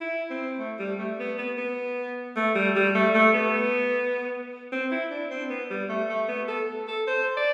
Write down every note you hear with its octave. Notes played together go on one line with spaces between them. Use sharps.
E4
C4
A3
G3
A3
B3
B3
B3
A3
G3
G3
A3
A3
B3
C4
E4
D4
C4
B3
G3
A3
A3
B3
A4
A4
C5
D5